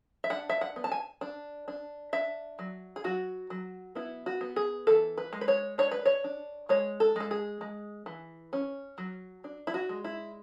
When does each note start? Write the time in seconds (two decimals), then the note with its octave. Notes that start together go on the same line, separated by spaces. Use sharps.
0.24 E5
0.30 D4 F#5
0.50 E5
0.61 F#5
0.76 B3
0.84 A5
0.92 G#5
1.21 D4
1.68 D4
2.13 D4 E5
2.59 F#3
2.96 G#4
3.04 F#3 F#4
3.50 F#3
3.95 B3 E4
4.26 F#4
4.41 B3
4.56 G#4
4.87 E3 A4
5.18 B4
5.33 G#3
5.41 B4
5.48 C#5
5.78 D4 C#5
5.91 B4
6.06 C#5
6.24 D4
6.69 G#3 C#5
7.00 A4
7.16 G#3 A4
7.31 G#4
7.61 G#3
8.06 E3
8.53 C#4
8.98 F#3
9.44 D4
9.67 E4
9.74 F#4
9.89 G#3
10.04 E4